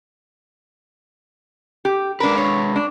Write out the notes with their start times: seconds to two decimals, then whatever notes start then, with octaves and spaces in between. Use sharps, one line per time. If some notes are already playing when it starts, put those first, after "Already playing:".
1.85 G4
2.20 G#3 D4 A#4 B4
2.38 C#5
2.76 D4